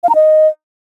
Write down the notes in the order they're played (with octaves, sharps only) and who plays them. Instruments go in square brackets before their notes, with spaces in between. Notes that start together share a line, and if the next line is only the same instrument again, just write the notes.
[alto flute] F5
A#5
D#5